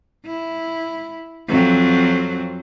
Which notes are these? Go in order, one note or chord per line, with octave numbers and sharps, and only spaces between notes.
E4
F2 F#3 C4